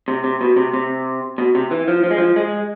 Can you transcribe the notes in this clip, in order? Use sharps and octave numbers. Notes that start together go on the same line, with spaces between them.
C3
C3
B2
C3
C3
B2
C3
E3
F3
F3
G#3
F3
G#3